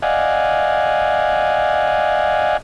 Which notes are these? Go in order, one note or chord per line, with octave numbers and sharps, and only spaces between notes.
D5 D#5 F5 F#5 G#5